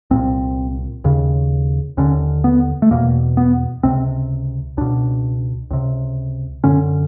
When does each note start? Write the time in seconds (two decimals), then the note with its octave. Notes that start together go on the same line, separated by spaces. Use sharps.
0.11 C2 A#2 C4
1.04 D#2 C#3
1.97 D#2 D3 C#4
2.44 B3
2.82 A3
2.91 E2 B2 A#3
3.37 B3
3.83 C#2 C3 C4
4.77 C#2 B2 D4
5.71 C#2 C3
6.64 F#2 D3 C#4